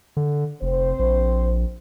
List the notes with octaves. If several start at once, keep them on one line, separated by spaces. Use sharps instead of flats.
D3
F1 C4 C5
A#1